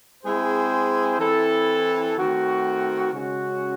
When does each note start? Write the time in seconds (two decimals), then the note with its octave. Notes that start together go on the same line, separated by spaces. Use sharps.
0.23 G#3 C4 E4 G#4 C5
1.19 E3 C4 E4 A4
2.17 D#3 A3 C4 F#4
3.12 C#3 G#3 C#4 F#4